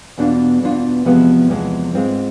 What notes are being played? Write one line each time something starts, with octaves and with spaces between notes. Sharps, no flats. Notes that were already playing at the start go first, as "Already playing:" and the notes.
E2 B2 B3 D4 F4
E2 B2 B3 D4 F4
E2 C3 F3 G#3 B3
E2 C3 F3 G#3 B3
G#2 G#3 C4 F4